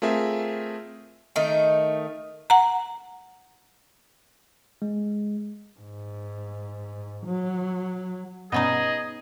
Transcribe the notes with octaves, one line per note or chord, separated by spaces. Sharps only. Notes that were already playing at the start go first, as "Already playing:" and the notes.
A3 C4 F4 G#4 A#4 E5
D#3 A3 D#4
F#5 A#5
G#3
G#2
F#3
G2 B2 B3 C#4 D#4 G#4 D#5